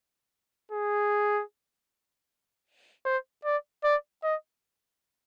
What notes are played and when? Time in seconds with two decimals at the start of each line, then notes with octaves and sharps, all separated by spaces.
0.72 G#4
3.06 C5
3.45 D5
3.84 D5
4.23 D#5